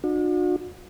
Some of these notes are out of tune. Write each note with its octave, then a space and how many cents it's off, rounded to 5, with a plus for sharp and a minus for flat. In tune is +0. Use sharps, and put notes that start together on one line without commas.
D4 +40 F#4 -40